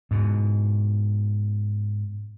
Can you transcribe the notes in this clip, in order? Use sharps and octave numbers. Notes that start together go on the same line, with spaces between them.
G#2 B2